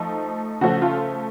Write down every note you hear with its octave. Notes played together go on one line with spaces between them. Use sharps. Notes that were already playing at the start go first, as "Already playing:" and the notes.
Already playing: F3 A3 D#4
C#3 F3 A3 C#4 F#4
F4